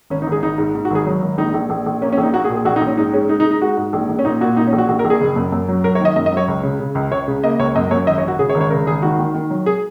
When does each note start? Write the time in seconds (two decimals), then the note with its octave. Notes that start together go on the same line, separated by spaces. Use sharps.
0.10 G#1 C#4
0.22 D#4
0.27 G#1
0.32 G#4
0.42 G#1 D#4
0.58 G#2
0.75 G#2
0.85 F#4
0.90 G#1 G#4
1.06 F#3
1.22 G#1
1.38 A#1 D#4
1.54 A#1
1.70 A#1
1.86 A#1
2.02 A#3 C#4
2.13 C#4
2.18 A#1
2.23 D#4
2.33 A#3 F#4
2.44 G#4
2.50 A#2
2.55 G#4
2.65 A#1 F#4
2.76 D#4
2.81 A#1
2.87 C#4
2.97 G#2 D#4
3.13 G#3 C#4
3.29 G#3 D#4
3.40 D#4
3.45 G#3
3.51 D#4
3.61 G#3 F#4
3.77 G#2
3.93 A#1
4.09 A#1
4.19 C#4
4.25 A#2 D#4
4.41 A#2 F#4
4.56 A#2 D#4
4.67 C#4
4.73 A#1
4.78 F#4
4.89 A#1 F#4
4.99 A#4
5.05 A#1
5.10 G#4
5.21 F#1
5.36 F#2
5.52 F#2
5.68 F#3
5.84 F#3 A#4
5.95 C#5
6.00 D#3
6.05 D#5
6.16 F#2 D#5
6.26 D#5
6.32 F#3 C#5
6.48 C#2
6.63 C#3
6.80 C#3
6.95 C#2
7.11 C#2 C#5
7.28 C#3
7.44 A#3 D#5
7.59 C#2 C#5
7.75 F#2 D#5
7.91 F#2 C#5
8.07 G#1 D#5
8.18 C#5
8.23 G#1
8.28 F#4
8.39 C#3 G#4
8.49 C#5
8.55 G#1
8.61 C#5
8.70 C#3 A#4
8.87 G#1 G#4
9.02 D#3 F#4
9.18 D#3
9.34 D#3
9.50 F#3
9.66 G#4